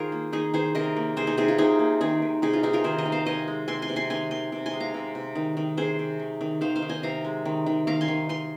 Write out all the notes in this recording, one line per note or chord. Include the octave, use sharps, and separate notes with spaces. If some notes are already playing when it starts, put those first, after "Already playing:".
Already playing: D#3 F4 G#4 A#4 C5
A#3
D#3 D#4 G#4
D#3 G#4 C5
C3 A#4 D#5
A#3
C3 G#4 C5
D#4 G#4
C3 D#4 G#4
F4
C3 D#4 G#4
A#3
D#3 D#4 G#4
D#3
C3 D#4 G#4
F4
C3 D#4 G#4
F4 A#4
D#3 G#4 C5
A#4 D#5
D#3
C5 F5
C3 D#5 G#5
G#3
C3 G#5 C6
G#5 C6
C3
G#5 C6
D#3 G#5 C6
D#3 G#5 C6
C3
G#5 C6
G#3
F5 A#5
C3
C3
D#3
D#3
C3 G#4 C5
C3
D#3
D#3
D#3 C5 F5
C5 F5
D#3
D#5 G#5
C3 F5 A#5
G#3
D#3
D#3
D#3 F5 A#5
G#5 C6
D#3
D#3 G#5 C6